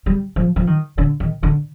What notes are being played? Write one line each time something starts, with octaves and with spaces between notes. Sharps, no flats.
G3
F3
F3
D#3
D3
D#3
D3